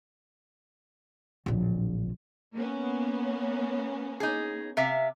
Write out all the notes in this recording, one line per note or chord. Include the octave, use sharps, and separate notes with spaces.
D1 A#1
A#3 B3 C#4
D#4 G#4
C3 E5 F5